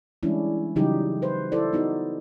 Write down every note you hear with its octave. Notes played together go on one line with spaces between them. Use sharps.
E3 G3 G#3 C#4 D4 E4
C#3 E3 F#3 G3 D#4 G4
B4 C5
E4 A4 C5 D5
B3 D#4 F#4